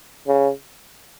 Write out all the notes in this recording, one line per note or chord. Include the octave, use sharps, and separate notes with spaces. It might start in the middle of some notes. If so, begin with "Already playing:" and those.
C#3